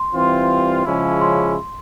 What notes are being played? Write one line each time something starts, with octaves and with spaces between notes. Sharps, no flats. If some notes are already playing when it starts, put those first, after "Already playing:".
Already playing: C6
E3 G3 C4 F4
C#3 F3 G#3 C#4 E4
C6